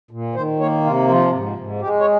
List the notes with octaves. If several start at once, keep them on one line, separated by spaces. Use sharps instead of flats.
A#2
D#3 C5
A#3 C#5
C3 F4
F3 F4
G#2
G#2
G#3 G4
C#5